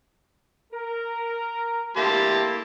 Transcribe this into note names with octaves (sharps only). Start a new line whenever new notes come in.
A#4
A3 A#3 E4 G4 A5 C6